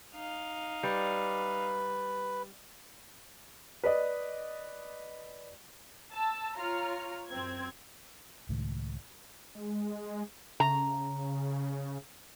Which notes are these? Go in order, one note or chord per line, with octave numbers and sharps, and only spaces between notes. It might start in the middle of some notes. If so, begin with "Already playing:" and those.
D#4 F5
G3 B4
B4 D5 D#5
A5 E6
F4 C#5 A#5 F6
F#2 C4 G#6
C#2 A2 D#3
G#3
C#3 A#5